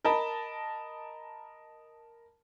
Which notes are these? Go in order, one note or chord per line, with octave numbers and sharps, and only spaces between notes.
A#4 D#5 A5 B5